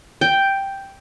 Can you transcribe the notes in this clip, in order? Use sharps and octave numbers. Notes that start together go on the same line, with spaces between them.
G5